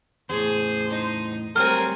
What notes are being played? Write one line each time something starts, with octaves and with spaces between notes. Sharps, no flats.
E2 A2 G#4 C5
D#4
F#3 G3 A3 C4 A#4 G#5 F6